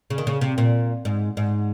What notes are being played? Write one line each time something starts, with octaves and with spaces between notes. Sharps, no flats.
C#3
D#3
C#3
C3
A#2
G#2
G#2